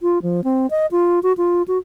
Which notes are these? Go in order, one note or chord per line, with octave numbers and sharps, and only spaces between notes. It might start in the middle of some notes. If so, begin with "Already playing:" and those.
F4
F3
C4
D#5
F4
F#4
F4
F#4